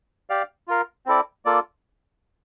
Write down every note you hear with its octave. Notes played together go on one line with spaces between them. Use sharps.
G4 D5 F5
F4 A#4 F5
C4 E4 A4 D5
A#3 F4 A4 D5